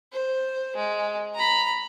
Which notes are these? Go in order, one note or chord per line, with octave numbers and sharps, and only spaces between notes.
C5
G#3
A#5 B5